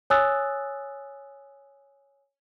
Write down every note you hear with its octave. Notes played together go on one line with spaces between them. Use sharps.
C#5 G#5 D#6 E6 F#6 A6